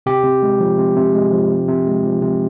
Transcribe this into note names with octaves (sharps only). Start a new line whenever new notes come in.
C3 G4
C3
G#3
F3
C3
C3
G#3
F3
C3
C3
G#3
F3
C3